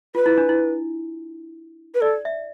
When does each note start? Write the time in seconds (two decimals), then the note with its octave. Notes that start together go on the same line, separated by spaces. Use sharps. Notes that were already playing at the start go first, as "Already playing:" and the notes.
0.15 F4 B4
0.26 E4
0.38 D4
0.49 E4
1.95 B4
2.01 A4 D5
2.25 E5